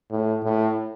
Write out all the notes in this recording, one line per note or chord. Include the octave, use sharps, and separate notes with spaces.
A2
A2